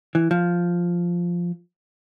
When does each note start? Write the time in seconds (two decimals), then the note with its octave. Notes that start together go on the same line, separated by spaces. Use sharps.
0.15 E3
0.31 F3